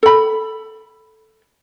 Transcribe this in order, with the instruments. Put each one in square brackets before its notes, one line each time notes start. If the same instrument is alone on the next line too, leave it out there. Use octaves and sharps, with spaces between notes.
[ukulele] A4 B5